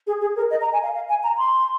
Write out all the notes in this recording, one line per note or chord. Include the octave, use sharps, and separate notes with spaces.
G#4
G#4
A#4
D#5
A#5
G#5
F5
F5
G#5
A#5
C6